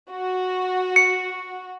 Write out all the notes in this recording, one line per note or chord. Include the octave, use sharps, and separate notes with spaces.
F#4
C#7